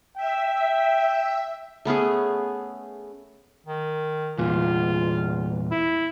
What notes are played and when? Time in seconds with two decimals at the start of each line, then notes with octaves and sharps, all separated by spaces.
0.17 E5 G5
1.85 A3 B3 C#4 G#4
3.66 D#3
4.38 E2 A#2 F4
5.71 E4